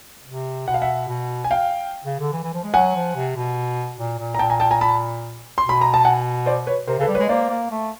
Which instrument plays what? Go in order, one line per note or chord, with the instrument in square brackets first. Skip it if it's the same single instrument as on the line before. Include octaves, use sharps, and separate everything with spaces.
[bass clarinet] C3
[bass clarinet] B2 [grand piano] F#5
[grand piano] F5
E5 F#5
[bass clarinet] B2
[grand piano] G#5
F5 G5
[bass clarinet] C#3
D3
E3
E3
F3
G#3
[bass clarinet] F#3 [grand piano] F#5 G#5
[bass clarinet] F3
C3
B2
A#2
A#2
[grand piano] A#5
[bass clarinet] A#2 [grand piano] G5 A5
[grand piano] G#5 A#5
G5 A5
G#5 A#5
A5 B5
C6
[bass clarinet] B2
[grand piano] B5
A#5
A5
F#5 G#5
C5 D5
B4 C#5
[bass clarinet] C3 [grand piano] A#4 C5
[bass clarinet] C#3 [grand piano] A4 B4
[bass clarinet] G3
[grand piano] B4 C#5
[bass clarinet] G#3
[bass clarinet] A#3 [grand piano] C5 D5
[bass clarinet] A#3
A3